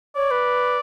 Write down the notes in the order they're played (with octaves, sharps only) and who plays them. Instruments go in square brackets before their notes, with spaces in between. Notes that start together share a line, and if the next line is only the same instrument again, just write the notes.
[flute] C#5 [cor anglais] D5
[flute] B4